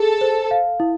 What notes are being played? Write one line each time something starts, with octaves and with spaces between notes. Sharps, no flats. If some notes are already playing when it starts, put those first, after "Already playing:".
Already playing: G#4 A4
C5
F5
E4